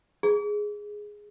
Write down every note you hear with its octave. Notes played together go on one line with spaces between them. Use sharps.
G#4